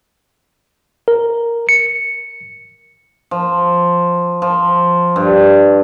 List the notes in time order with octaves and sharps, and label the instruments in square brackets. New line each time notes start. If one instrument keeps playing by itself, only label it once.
[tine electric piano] A#4
C#7
[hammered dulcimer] F3
F3
G2